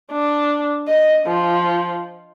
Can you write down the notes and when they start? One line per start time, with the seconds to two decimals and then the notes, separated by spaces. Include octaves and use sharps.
0.12 D4
0.88 D#5
1.26 F3